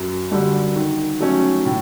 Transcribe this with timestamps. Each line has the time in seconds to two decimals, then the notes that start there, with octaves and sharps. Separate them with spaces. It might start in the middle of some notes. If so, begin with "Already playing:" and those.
Already playing: F#2
0.31 D3 G3
0.76 D#3
1.20 F#3 A3 C#4
1.65 A2